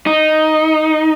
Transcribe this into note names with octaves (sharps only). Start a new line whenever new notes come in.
D#4